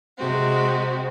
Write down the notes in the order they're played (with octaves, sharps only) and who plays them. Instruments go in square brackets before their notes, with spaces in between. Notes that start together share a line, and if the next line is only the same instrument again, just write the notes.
[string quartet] C3 G#3 C4 F#4